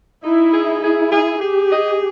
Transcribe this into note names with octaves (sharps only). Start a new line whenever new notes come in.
D#4 E4
G#4
E4 G#4
G#4
G4 G#4
D#5